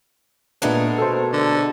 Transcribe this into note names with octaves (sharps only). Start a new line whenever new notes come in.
A#2 G#3 A3 B3 D4 A#4 F#6
B2 A4 C5
D3